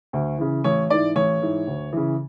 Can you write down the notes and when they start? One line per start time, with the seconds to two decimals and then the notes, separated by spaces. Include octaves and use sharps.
0.13 D2
0.38 C#3 E3
0.64 A1 C#5
0.90 G#2 E3 D5
1.16 A1 C#5
1.41 G#2 E3
1.67 D2
1.93 C#3 E3